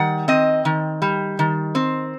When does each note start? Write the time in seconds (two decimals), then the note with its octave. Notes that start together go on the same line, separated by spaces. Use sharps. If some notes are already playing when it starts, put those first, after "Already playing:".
Already playing: D#3 G3 F#5
0.28 C4 D#5
0.65 D#3
1.02 G3
1.39 D#3
1.75 C4